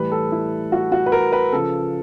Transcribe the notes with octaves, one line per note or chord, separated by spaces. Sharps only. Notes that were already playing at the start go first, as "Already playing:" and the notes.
Already playing: A2 E3 G3 B4
A4
E4
F#4
F#4
B4
A#4
B4
C#3 F3 A4